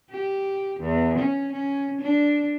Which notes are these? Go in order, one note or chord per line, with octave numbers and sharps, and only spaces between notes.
G4
E2
C#4
C#4
D4